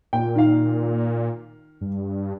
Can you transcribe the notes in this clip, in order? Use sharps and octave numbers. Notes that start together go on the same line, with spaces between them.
A#2 G5
D#3 F5
G2